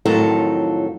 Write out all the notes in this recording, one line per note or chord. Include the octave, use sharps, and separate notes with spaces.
F2 A2 D#3 F#3 F4 A4